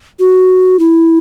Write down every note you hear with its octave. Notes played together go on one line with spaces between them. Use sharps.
F#4
E4